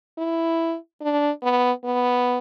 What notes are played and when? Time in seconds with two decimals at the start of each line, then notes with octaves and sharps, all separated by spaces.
0.18 E4
1.01 D4
1.43 B3
1.84 B3